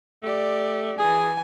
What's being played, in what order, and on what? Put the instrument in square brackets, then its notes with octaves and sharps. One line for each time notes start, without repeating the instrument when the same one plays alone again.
[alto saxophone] A3 [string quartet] G4 D5
[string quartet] E3 [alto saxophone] G#4 [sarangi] G#5